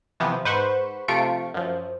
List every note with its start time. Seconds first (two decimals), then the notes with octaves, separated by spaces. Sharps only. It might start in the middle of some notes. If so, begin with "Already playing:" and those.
0.20 C3 E3 F3 B3
0.45 G#2 B4 C5 F#5 C#6
1.08 C3 F3 A3 F4 C#6 D7
1.54 F#2 F3